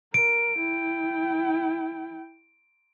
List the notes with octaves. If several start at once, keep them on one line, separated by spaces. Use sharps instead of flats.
A#4 D7
E4 G5